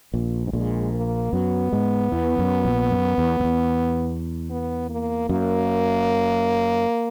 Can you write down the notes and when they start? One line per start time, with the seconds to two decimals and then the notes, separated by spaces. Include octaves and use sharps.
0.14 A#1 A#2
0.47 G#2
0.53 A#1 A#2 G#3
0.94 A#3
1.33 F#2 F#3 B3
1.72 G#2 G#3
2.12 E2 E3
2.39 F#2
2.65 A#1 A#2
2.91 F#2
3.18 E2
3.40 F#2
3.44 E2
4.50 B3
4.90 A#3
5.29 F#2 A#3